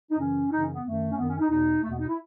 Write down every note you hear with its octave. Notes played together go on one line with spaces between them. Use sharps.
D#4
F#2 C#3 E3 C#4
F#2 C#3 E3 D#4
C#4
B3
F#2 D#3 A3
C#4
F#2 D#3 B3
C#4
D#4
E2 B2 D#4
E2 B2 A3
B3
D#4
E4